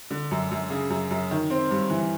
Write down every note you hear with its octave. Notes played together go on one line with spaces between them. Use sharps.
D3
F#2
F#2
C#3
F#2
F#2
D#3
C4
G2
E3